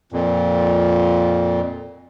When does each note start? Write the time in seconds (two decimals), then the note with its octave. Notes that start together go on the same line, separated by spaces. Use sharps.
0.12 F2 A#2